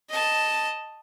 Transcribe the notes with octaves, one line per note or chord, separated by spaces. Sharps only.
D#5 A5